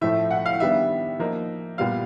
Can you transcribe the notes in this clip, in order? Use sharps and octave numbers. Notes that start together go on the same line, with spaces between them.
A2 F3 A3 E5
F#5
F5
D#3 G3 B3 D4 E5
F3 A#3 D#4
A#2 G3 B3 F5